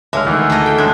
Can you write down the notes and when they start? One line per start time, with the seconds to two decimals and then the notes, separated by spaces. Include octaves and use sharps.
0.13 C#2 D3 G#3 E5 F6
0.27 D2 D#3 E3
0.50 A3 D#5
0.66 G5
0.78 G#3 A3 C#4 D4